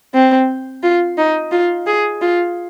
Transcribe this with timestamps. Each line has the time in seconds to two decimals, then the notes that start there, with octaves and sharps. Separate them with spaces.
0.14 C4
0.83 F4
1.18 D#4
1.52 F4
1.87 G#4
2.21 F4